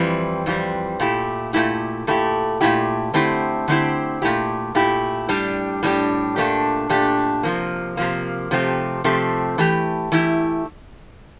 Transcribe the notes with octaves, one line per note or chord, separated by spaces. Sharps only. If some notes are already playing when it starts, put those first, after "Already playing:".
Already playing: F2 E3 G3 C4
F2 E3 G3 C4
A#2 A3 E4 G4
A#2 A3 E4 G4
A#2 A3 E4 G4
A#2 A3 E4 G4
D3 A3 C4 E4 G4
D3 A3 C4 E4 G4
A#2 A3 E4 G4
A#2 A3 E4 G4
A2 G3 D4 G4
A2 G3 D4 G4
A#2 A3 D4 G4
A#2 A3 D4 G4
C3 F3 A#3
C3 F3 A#3
C3 F3 A3 C4 G4
C3 F3 A3 C4 G4
E3 A3 E4 G4
E3 A3 E4 G4